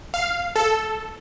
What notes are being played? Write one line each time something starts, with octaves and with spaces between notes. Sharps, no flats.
F5
A4